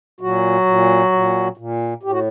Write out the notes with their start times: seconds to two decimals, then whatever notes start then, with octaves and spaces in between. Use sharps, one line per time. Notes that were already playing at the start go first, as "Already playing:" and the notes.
0.21 A#2 F#3 F#4
0.66 A#2
1.12 A#2
1.57 A#2
2.03 A2 G4
2.11 F#4